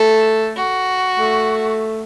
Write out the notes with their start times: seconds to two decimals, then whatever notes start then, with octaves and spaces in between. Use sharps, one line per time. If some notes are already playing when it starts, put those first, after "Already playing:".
Already playing: A3 A4
0.56 F#4
1.19 A3